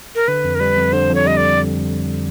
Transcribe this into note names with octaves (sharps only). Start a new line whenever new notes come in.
A#4
D3 B4
F2
A#4
G3 B4
F2
D3 C5
F2
C#5
G3 D#5
D5